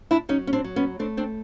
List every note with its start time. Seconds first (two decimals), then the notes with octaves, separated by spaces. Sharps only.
0.11 D4 E4
0.29 F#3 C#4 D#4
0.47 C#4
0.53 C4 D4
0.64 F#3
0.76 B3 C#4
0.99 A3 C4 D4
1.17 C4 D4